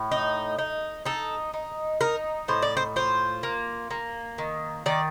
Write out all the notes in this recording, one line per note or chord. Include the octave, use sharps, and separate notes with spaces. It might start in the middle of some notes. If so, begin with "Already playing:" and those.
Already playing: A2
D#4
D#4
D#4 A4
D#4
D#4 A#4
A2 C5
D5
C5
F4 C5
A#3
A#3
D#3
D#3 D5